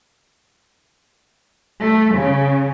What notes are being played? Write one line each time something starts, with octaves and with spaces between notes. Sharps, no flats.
A3
C#3